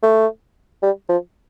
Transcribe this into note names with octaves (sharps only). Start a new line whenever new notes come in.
A3
G3
F3